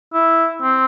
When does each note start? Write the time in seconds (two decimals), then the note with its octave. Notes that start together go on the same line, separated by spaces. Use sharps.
0.14 E4
0.62 C4